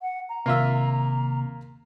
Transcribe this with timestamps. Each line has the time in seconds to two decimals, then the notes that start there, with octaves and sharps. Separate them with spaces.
0.02 F#5
0.29 A#5
0.46 D#2 C3 A#3 F4 E5